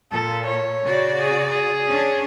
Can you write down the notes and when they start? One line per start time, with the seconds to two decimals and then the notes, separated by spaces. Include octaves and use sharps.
0.12 A#2 A4
0.46 C#5
0.85 C#3 F#4 D5
1.20 G#4
1.50 G#4
1.86 C#4 D4 C#5